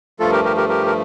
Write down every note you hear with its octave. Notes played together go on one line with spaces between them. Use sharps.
G2 F3 A3 F4 A4
G4 A#4
G4 A#4
G4 A#4
G4 A#4
A#4